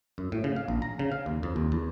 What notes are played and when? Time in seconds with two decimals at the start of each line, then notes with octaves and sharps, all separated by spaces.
0.18 F#2
0.32 A2
0.44 C#3
0.56 F5
0.68 A#1
0.82 A#5
0.99 C#3
1.12 F5
1.26 D#2
1.43 F2
1.56 D#2
1.72 E2